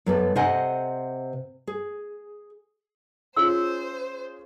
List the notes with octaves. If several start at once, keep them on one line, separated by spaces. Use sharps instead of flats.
F#2 B3 A4
C3 C5 D#5 F#5 G#5
G#4
C#4 F4 G#4 C5 E6